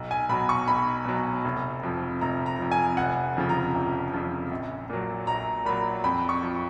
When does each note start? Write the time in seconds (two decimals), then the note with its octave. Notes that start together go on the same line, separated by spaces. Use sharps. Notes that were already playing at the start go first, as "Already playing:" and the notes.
Already playing: B1
0.11 G#5
0.29 B2 F#3 B5
0.49 C#6
0.68 B1 B5
1.06 B2 F#3
1.45 F1
1.83 F2 F3
2.21 F1 A#5
2.46 A#5
2.59 F2 F3
2.71 G#5
2.97 F1 F#5
3.37 F2 C#3 F3
3.49 A#5
3.75 F1
4.13 F2 C#3 F3
4.51 A#1
4.90 A#2 F#3
5.27 A#1 A#5
5.65 A#2 F#3 B5
6.04 F2 B5
6.29 C#6
6.43 F3